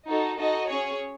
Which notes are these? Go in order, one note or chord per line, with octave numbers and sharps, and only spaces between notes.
D#4 F#4 A4
D#4 F#4 A4 D#5
C#4 G#4 C#5